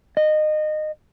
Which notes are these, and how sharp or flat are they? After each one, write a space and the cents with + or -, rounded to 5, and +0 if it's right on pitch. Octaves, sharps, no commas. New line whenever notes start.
D#5 -20